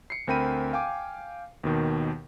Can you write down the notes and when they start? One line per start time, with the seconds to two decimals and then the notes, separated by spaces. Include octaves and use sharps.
0.10 C7 C#7
0.27 D2 C4 A#4 G5 B5 D#7
0.73 F5 G5 G#5 D6
1.64 D#2 B2 D#3